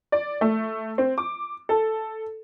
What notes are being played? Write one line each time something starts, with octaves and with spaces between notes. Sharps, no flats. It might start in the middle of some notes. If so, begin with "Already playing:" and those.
D5
A3
C4
D6
A4